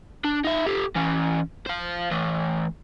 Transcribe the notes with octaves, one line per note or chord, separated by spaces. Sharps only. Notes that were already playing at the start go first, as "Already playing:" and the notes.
D4
D#4 E5
G4 A4
E3 C#4
C5 F5
E3 A3